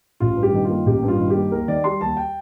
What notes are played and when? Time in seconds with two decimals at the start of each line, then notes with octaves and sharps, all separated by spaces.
0.20 A1 F4
0.37 G2
0.43 G4
0.54 D#3
0.65 F4
0.70 A#3
0.86 A1 G4
1.03 G2
1.08 F4
1.19 D#3
1.30 A#3 G4
1.52 D#2 A#4
1.68 D#3 D5
1.84 G3 C6
2.01 D#2 A5
2.17 G5